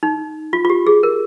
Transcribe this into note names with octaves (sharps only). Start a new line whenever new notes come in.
D#4
F4
F4
G4
G#4
A#4